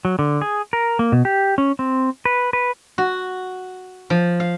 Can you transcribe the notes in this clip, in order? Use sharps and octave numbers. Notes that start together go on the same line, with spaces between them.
F#3
D3
G#4
A#4
A#3
B2
G4
C#4
C4
B4
B4
F#4
F3
F5